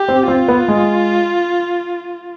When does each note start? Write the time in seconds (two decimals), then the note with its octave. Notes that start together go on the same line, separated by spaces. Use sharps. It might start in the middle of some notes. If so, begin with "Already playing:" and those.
Already playing: G4
0.08 C4
0.28 C4 F4
0.48 B3
0.68 G#3